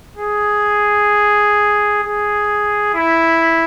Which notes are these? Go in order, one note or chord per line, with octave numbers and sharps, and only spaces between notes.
G#4
G#4
E4